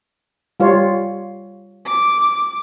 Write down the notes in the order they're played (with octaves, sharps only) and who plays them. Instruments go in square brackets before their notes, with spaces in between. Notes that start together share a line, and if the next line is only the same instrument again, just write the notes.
[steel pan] G3 F4 C#5
[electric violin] D6